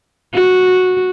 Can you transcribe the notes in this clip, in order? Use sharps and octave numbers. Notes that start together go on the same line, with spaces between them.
F#4